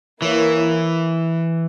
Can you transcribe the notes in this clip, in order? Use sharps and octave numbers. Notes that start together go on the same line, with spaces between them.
E3 A#3 E4 A#4 C#5